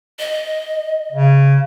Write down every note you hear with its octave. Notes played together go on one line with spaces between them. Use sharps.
D#5
C#3